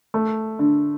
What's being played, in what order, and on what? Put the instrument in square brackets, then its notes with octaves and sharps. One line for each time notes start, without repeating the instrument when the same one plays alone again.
[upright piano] A3
D3